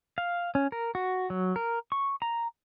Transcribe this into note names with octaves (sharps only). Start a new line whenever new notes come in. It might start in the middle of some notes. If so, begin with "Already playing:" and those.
F5
C#4
A#4
F#4
F#3
A#4
C#6
A#5